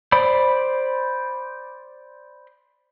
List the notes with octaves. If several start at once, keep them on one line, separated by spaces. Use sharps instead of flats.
C5 D5 B5